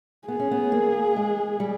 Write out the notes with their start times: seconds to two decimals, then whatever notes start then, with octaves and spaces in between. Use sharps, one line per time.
0.28 B3 G#4
0.40 C#4
0.51 B3
0.72 A#3
1.16 G#3
1.60 G3